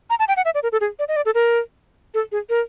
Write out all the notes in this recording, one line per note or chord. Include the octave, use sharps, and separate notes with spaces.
A#5
A5
G5
F#5
E5
D5
A#4
A4
G#4
D5
D#5
D5
A4
A#4
A4
G#4
A#4